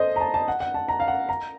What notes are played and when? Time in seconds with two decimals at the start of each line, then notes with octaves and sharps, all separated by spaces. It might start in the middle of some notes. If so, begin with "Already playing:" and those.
Already playing: A4 C5 D#5
0.16 A#5
0.21 A5
0.34 A5
0.48 F#5
0.60 F#5
0.74 A5
0.88 A#5
1.00 F5
1.08 F#5
1.29 A#5